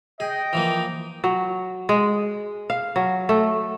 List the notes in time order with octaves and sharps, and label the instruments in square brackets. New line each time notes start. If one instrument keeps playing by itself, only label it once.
[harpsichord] G#4 [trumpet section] D#5 G5
[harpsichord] E3 F3 A#3
[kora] F#3
G#3
F5
F#3
A3